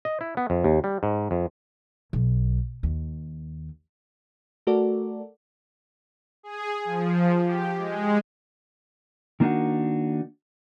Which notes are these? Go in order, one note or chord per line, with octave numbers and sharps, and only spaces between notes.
D#5
E4
B3
F2
D#2
G3
G#2
F2
B1
D#2
A3 F#4 A4 A#4 D5
G#4
F3
G4
G#3
D#3 A#3 D4 D#4 F#4